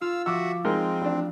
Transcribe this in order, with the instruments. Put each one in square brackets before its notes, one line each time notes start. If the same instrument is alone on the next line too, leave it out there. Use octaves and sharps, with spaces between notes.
[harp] F4 [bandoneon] F5 E6
[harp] F3 [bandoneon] F#4 E5 F#5 [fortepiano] D6 E6
[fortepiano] G#3 D#4 A#4 [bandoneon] C4
[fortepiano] A1 D4